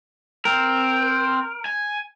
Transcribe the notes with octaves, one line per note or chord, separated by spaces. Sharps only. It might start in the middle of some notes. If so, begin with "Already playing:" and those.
C4 A#4
G#5